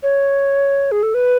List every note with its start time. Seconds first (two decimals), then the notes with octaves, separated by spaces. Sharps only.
0.03 C#5
0.92 G#4
1.03 A4
1.14 B4